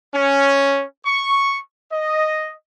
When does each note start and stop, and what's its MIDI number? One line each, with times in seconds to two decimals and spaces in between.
0.15 0.83 61
1.06 1.59 85
1.92 2.52 75